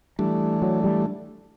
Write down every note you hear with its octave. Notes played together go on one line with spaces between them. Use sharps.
E3 G3 A3 D4
F#3
G3